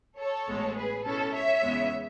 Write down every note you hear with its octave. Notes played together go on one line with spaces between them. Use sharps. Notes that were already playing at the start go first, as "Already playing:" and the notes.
A4 C#5
A1 A2 G#3 B3
G#4 B4
B2 G#3 C#4 E4 A4 C#5
C#5 E5
E2 C#3 G#3 B3